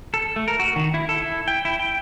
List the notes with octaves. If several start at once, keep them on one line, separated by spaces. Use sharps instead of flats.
A4
A3
A#4
F#4
D#3
E4
A4
E4
G5
E4
G5